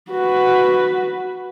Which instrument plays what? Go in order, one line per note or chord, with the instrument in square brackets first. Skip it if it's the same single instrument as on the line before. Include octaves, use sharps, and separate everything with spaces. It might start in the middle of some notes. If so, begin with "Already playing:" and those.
[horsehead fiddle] F#4 B4